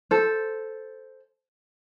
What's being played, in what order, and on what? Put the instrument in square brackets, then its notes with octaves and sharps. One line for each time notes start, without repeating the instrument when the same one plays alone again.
[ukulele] A4 C5